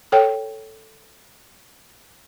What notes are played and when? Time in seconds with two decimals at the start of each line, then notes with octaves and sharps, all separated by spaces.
0.12 A4 C#5 G5